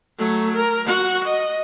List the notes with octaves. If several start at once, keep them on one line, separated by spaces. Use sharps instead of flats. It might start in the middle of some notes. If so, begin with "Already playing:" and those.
F#3 A3
A#4
F#4 F#5
D#5